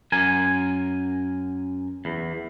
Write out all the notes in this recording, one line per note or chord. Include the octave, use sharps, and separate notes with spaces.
F#2 A#4 G#5
E2